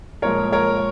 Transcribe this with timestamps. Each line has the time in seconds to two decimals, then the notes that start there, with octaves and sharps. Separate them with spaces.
0.22 A#2 F3 G#3 A#4 C#5
0.52 A#4 C#5